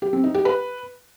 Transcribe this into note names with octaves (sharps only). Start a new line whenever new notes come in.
G4
C4
D#4
G4
B4